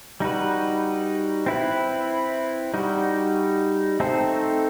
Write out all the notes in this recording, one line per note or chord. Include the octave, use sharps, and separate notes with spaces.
G3 D#4 F#4 B4
C4 E4 B4
G3 D#4 F#4
A3 C4 D#4 A4 C5